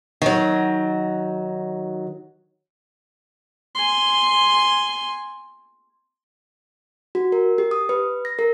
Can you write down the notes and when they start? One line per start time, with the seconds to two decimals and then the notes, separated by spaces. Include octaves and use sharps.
0.22 D#3 F#3
3.75 G#5 C6
7.15 F#4
7.32 A#4
7.58 G4
7.71 D#6
7.89 B4
8.25 A#6
8.39 A#4